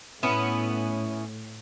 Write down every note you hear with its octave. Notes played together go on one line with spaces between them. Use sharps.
A2 B3 C#4 E4